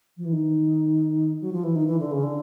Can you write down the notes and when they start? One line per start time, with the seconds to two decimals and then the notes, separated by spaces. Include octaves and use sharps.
0.17 F3
0.25 E3
0.33 D#3
1.41 F#3
1.53 F3
1.64 E3
1.76 D#3
1.88 E3
2.00 D3
2.11 C#3
2.23 D3